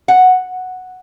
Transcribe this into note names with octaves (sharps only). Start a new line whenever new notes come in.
F#5